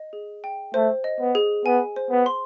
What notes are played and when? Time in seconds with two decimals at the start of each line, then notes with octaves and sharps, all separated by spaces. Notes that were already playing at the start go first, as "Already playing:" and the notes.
Already playing: D#5
0.13 G#4
0.44 G5
0.74 A3 C5
1.04 D#5
1.20 B3
1.35 G#4
1.65 B3 G#5
1.96 C5
2.11 B3
2.26 C6